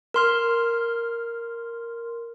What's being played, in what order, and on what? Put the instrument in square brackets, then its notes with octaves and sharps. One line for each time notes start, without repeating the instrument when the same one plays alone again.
[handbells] A#4 C6 F6